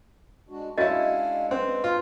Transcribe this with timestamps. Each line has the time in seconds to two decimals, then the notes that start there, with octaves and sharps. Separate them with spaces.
0.49 G#3 D4 F#4
0.78 G#3 C#4 D4 E4 F#4 C#5 D#5 F5
1.51 C4 C#4 B4
1.84 F4